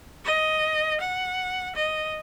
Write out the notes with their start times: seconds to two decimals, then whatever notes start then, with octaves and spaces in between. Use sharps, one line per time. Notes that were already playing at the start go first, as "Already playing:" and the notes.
0.25 D#5
1.00 F#5
1.76 D#5